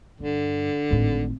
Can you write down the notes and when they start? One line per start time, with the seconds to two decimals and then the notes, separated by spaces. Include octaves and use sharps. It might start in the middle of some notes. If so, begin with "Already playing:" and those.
0.20 G2 D3
0.91 G#1 A2